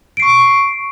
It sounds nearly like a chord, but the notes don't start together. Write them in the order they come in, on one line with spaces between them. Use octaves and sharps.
D7 C7 C#6